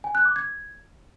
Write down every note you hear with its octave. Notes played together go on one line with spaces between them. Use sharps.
G#5
F#6
D6
G#6